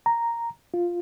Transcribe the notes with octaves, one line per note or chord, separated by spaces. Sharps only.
A#5
F4